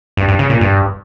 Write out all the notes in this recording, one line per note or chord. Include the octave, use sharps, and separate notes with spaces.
G2
G2
C#3
A#2
G2